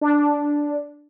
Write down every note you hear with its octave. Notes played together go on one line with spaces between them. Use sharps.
D4